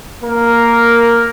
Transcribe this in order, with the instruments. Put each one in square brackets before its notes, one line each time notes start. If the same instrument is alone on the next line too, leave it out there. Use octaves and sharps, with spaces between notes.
[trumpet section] A#3 A#4